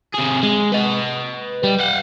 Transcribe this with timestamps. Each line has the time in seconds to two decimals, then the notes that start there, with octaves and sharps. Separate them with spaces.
0.14 C3 G#4
0.43 G#3
0.72 B4 D#5
1.64 G3
1.80 F5 F#5